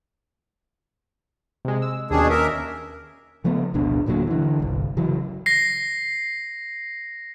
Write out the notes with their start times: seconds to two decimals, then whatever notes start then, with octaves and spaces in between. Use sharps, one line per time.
1.65 C3 G#3
1.82 E6
2.11 D#2 B2 D#3 C#4 D4 G#4
2.30 A#4 E5
3.44 C#3 F3 A3 B3
3.74 D1 G#1 B2 D4
4.06 D#1 A#2 D3 F#3
4.27 D3 E3
4.60 G1 C2
4.97 C#3 E3 F#3
5.46 A#6 C7